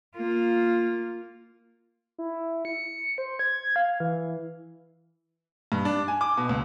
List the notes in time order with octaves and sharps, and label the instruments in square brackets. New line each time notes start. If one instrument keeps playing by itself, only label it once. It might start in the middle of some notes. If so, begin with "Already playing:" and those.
[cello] A#3 F4
[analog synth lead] E4
C#7
C5
G#6
F5
E3
[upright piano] G2
D4
G#5
D6
B2
C#2